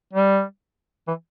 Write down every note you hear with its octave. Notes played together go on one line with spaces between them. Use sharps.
G3
E3